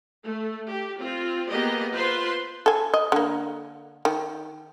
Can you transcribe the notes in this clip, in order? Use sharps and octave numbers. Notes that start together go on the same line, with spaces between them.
A3
G4
C4 F4
A#3 B3 G4 G#4 D#5
F4 B4 C5 C6
A4 G#5
D#5
D3 A#3
D#3